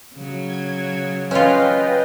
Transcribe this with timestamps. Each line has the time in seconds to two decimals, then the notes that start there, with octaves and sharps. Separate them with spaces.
0.15 C#3 F#3
0.49 G#6
1.31 C#4 F4 B4 D#5 G5